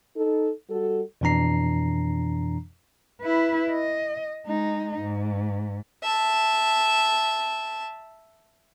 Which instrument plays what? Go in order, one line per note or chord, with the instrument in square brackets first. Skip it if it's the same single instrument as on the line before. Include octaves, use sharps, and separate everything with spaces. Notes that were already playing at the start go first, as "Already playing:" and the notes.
[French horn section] D#4 A4
G3 F#4 A4
[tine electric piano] F2 B2 E3 D4 A#5 C7
[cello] E4 B4
D#5
G#3 D#4
G#2
[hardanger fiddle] E5 A5